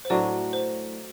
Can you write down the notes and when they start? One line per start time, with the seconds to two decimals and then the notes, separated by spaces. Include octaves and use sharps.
0.05 C5
0.10 A2 F#3 A3 D4 D5
0.53 C5